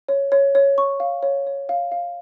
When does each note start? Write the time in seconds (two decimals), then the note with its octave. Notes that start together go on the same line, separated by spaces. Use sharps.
0.09 C#5
0.32 C#5
0.55 C#5
0.78 C#6
1.00 F5
1.23 C#5
1.47 C#5
1.69 F5
1.92 F5